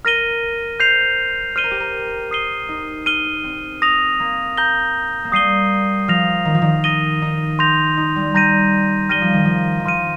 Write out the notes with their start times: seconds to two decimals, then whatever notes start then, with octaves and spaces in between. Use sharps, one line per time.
0.05 A#4 F6 A#6 D#7 G7
0.80 C5 G6 C7 F7
1.56 C5 F6 D#7 G7
1.64 A#4
1.71 G4
1.80 A#4
2.31 D#6 C7 D#7 G7
2.69 D#4
3.06 F6 D#7 G7
3.44 C4
3.82 D#6 A#6 F7
4.20 A#3
4.57 A#5 G6 A#6 G7
5.24 A#3
5.32 G3 D#6 C7 D#7 G7
6.08 F3 F6 A#6 F7
6.45 D#3
6.54 F3
6.62 D#3
6.84 D#6 A#6 D#7 G7
7.22 D#4
7.59 C6 G6 A#6 F7
7.97 D#4
8.16 G3
8.34 G3 A#5 G6 A#6 D#7
9.09 G3 F6 A#6 D#7 G7
9.21 F3
9.33 D#3
9.45 F3
9.80 D#3
9.85 F3 C6 F6 D#7